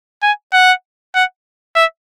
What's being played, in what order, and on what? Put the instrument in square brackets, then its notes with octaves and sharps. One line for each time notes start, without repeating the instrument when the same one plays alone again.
[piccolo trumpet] G#5
F#5
F#5
E5